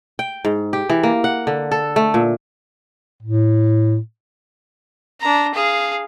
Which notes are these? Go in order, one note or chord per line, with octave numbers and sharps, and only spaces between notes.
G5
G#2
G4
E3
A#3
F#5
D3
A4
A3
A#2
A2
D4 A#5
G#4 F5